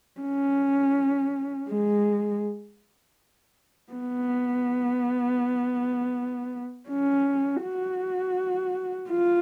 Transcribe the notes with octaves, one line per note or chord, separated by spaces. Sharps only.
C#4
G#3
B3
C#4
F#4
F4